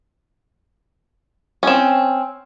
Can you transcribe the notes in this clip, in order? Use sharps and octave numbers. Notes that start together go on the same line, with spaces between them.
C4 C#4